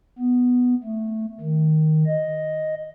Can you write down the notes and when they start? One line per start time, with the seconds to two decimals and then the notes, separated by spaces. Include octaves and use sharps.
0.19 B3
0.84 A3
1.40 D#3
2.06 D#5